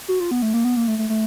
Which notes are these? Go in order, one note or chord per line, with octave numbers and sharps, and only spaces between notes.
F#4
F4
B3
A3
A#3
B3
A#3
A3
A3
A3